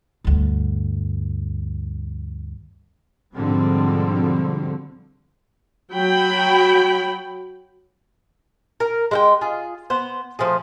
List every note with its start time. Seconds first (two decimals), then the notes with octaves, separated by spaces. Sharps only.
0.24 D2 G2
3.35 G#2 B2 D3 F3 G3 C4
5.94 F#3 G5 B5
8.80 A#4
9.11 G#3 F5 G5
9.41 F4 G#4
9.90 B3 C5
10.39 F3 A3 G#4